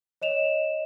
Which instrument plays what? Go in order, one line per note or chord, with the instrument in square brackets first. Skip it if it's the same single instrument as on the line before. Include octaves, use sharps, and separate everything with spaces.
[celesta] C#5 D#5 E7 F7